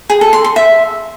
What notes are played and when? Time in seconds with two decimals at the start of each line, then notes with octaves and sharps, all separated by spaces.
0.10 G#4
0.21 A4
0.33 C6
0.44 C6
0.56 E5